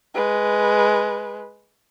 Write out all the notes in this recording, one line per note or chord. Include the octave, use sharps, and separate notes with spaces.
G#3 B4